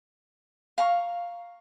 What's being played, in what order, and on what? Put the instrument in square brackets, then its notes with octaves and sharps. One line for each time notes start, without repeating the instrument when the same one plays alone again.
[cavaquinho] F5 A#5 C#6